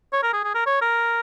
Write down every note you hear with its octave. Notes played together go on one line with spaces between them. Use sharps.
C#5
A#4
G#4
G#4
A#4
C#5
A#4